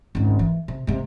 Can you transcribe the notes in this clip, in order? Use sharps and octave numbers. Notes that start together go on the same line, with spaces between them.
G#1 C#2
E3
C3
C3 G#3